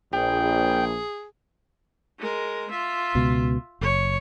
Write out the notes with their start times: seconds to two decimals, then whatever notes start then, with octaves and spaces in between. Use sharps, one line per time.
0.13 A#1 G#4 G5
2.19 G#3 A#4
2.71 F4 E5
3.15 C#2 B2
3.81 F#1 C#5